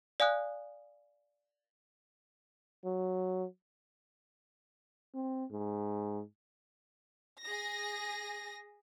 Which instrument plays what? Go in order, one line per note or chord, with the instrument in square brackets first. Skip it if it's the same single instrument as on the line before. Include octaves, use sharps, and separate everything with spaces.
[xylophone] D5 F5 G#5 D#6 F#6
[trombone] F#3
[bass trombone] C4
G#2
[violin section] G#4 A#6